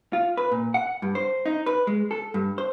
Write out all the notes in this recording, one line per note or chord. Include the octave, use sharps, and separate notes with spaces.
F4
B4
A#2
F#5
G2
C5
D#4
B4
G#3
A4
G2
C5